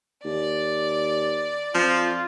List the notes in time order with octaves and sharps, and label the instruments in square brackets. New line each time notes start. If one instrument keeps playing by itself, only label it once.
[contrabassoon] D#2 [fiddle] D5
[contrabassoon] F2 [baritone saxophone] F3 [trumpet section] F4